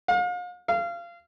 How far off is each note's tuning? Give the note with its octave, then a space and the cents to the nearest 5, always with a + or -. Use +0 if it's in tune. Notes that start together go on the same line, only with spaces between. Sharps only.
F5 +40
F5 -25